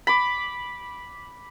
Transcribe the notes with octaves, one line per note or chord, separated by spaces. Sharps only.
B5 D6